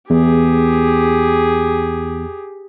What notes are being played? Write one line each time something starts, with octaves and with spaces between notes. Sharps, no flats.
E2 G4 G#4